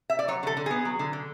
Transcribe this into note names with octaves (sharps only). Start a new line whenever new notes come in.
E5
D5
F#3 C#5
D3 A4
D3
B3 G#4
F#3
D3
D3